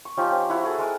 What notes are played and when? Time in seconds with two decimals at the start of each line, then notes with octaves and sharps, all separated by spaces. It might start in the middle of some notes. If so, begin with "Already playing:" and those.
0.05 C#6
0.17 F3 C#4 D#4 G4
0.31 C4
0.50 E4 F#4 F#5 A#5
0.63 F#4 G#4 A4
0.78 G#3 A#4 D#6